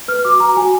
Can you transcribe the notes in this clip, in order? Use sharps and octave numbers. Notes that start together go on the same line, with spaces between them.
B4 F6
F#4 D6
F#4 A#5
F#4 G#5